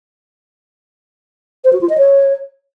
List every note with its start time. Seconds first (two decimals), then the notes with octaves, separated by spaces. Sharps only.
1.64 C5
1.73 F#4
1.81 F4
1.89 D#5
1.98 C#5